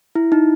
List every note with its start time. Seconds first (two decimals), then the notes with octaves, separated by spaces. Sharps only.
0.15 E4
0.32 D#4